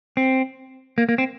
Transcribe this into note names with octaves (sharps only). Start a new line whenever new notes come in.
C4
A#3
A#3
C4